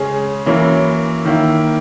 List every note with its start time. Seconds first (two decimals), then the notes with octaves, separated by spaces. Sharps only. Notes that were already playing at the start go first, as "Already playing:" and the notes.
Already playing: C#3 G#3 C#4 G#4
0.46 F#2 E3 A#3 C#4 E4
1.25 D#3 A#3 E4